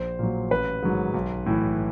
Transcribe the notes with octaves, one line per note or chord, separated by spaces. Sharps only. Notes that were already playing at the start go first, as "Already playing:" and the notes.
Already playing: A#1 C5
A#2 F#3
A1 B4
G#2 D#3 F#3
B1
A2 E3